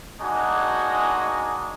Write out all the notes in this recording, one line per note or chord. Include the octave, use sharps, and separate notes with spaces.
G#3 A#3 D4 D#4 F#4 G#5